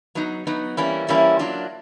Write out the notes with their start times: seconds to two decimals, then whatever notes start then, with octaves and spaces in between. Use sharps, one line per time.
0.15 F#3 B3 D#4
0.47 F#3 B3 D#4
0.77 E3 G3 A#3 C#4 E4
1.08 E3 G3 A#3 C#4 E4
1.39 F#3 A#3 D4 F4